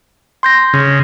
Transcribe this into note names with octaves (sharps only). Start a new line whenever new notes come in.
C6 G6 A#6
C#3